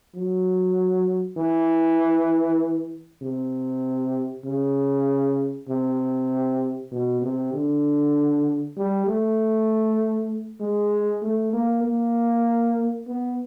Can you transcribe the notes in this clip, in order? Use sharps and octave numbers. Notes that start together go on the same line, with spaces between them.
F#3
E3
C3
C#3
C3
B2
C3
D3
G3
A3
G#3
A3
A#3
A#3
B3